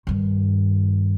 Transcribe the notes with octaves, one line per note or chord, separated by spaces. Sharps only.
G2 D#3